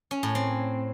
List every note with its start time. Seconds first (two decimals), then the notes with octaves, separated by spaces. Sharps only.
0.11 C#4
0.23 A2
0.35 C4